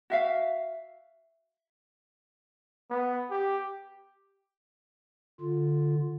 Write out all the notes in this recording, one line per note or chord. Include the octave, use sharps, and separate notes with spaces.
F#4 E5 F5
B3
G4
D3 F4